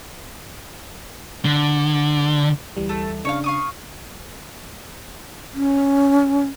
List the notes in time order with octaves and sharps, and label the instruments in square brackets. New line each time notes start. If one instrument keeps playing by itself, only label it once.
[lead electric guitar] D3
[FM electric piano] D2 E3 G3
[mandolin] A3
[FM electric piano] C#3 D4 [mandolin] C#5 F5
[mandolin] F5 C#6 D#6
[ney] C#4